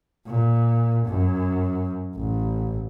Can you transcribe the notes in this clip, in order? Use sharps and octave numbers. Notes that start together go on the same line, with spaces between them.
A#2
F#2
A1